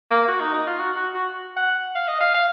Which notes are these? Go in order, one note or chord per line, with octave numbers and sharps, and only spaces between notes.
A#3
F#4
D#4
D#4
F4
F#4
F#4
F#4
F#5
F5
D#5
F5
F5